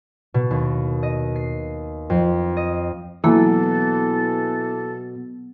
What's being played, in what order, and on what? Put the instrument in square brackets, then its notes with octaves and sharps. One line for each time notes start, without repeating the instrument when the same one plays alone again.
[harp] B2
D#2
D#5
C7
F2
D#5
[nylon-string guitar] B2 [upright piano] E3 [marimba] F#3 A#3 E6 [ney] A4